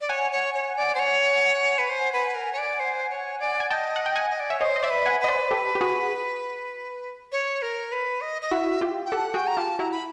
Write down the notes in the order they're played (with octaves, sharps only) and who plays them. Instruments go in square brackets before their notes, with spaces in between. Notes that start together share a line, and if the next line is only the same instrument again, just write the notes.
[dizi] D5
[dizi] C#5 [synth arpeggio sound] F#5 G#5
[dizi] C#5
C#5
D5
C5
C#5
B4
C5
B4
A#4
C#5
D5
C5
C#5
D5
[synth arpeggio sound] G#5
[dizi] D#5 [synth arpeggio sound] G5 A5
[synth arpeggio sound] F#5
G5
F#5 G#5
[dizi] D#5
D5
[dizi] C#5 [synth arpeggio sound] E5
[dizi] C5 [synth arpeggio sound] C#5 D#5
[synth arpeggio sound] D#5
D5 E5
[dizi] B4
[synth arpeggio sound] F#5 G#5
[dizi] B4 [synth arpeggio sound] D#5
[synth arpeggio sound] C5 D5
G4 A4
G4
F#4 G#4
[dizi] C#5
A#4
B4
D#5
D#5
[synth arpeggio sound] E4 F#4 [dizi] E5
[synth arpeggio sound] F4 G4
[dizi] G5
[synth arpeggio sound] G4 A4 [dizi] F#5
[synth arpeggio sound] F#4 G#4 [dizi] G5
[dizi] A#5
[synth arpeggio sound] F4 G4 [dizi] A5
[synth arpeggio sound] E4 F#4 [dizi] A#5
[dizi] B5